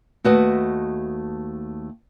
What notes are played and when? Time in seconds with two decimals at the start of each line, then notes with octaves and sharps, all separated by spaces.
0.24 D#2 A3 F#4 B4 D#5